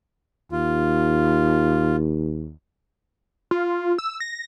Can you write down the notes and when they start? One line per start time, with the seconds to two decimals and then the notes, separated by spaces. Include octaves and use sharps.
0.52 D#2 F4
3.51 F4
3.98 E6
4.20 A#6